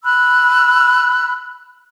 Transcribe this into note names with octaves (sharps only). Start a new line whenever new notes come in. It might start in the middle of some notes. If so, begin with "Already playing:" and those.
B5 E6 F#6